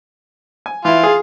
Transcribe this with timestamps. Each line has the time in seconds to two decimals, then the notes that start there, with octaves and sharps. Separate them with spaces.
0.66 G#5
0.85 E3 E4 F4
1.03 G#4